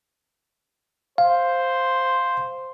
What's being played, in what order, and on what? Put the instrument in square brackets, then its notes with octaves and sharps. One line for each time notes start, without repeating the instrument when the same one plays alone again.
[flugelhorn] C5 [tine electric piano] F5